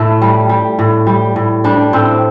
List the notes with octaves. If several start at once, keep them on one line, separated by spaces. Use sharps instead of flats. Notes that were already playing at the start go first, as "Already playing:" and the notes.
Already playing: A2 A3
G3
G3
A2
G3
A2
G3 D4
A2 C4